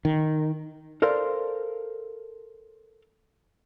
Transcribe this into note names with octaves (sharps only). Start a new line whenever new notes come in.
D#3
A4 A#4 C5 D5 F5